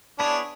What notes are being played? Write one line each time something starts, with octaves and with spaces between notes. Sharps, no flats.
B3 D4 E4 G#4 C#5